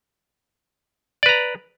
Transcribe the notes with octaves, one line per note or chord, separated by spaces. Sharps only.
B4 D5 A#5